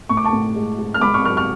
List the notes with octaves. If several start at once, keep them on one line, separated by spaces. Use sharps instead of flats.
A2 C#6
D6
A5 C#6
A2
G#3
G#3
F6
G#2 B5 D6
C#6 F6
F#3 C#6 F6
C#6 F6